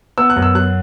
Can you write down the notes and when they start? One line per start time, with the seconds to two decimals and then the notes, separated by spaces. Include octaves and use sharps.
0.18 B3 E6
0.30 F#6
0.36 F#2
0.42 E6
0.55 F#3 F#6